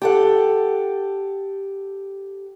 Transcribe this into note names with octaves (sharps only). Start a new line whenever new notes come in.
G4 A4 F#5